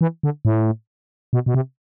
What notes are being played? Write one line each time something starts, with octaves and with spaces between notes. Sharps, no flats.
E3
D3
A2
B2
B2
C3